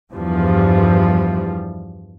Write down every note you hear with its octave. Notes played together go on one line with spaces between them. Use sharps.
E2 G2 F3 G3